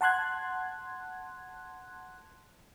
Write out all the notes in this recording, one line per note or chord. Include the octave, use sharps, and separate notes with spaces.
F#5 A5 C6 F#6 G#6